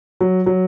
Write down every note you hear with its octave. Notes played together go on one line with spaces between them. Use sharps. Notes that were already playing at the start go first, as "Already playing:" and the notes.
F#3
F#3